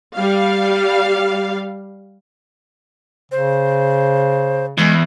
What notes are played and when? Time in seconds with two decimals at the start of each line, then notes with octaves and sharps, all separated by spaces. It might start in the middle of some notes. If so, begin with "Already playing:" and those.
0.13 G3 F5
3.32 C#3 C5
4.78 E2 G#3